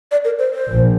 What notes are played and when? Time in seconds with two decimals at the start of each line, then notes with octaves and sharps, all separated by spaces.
0.11 D5
0.25 A#4
0.39 C5
0.54 C5
0.67 A#1